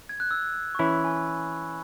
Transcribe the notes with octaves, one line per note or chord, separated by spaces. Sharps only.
G#6
F#6
E6
C#6
E3 C#4 E4 B5
G#5